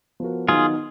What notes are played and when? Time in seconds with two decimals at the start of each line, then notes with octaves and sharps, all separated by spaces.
0.20 F3 B3 F#4 A#4
0.48 D#3 F#3 B3 D#4 F4 G#4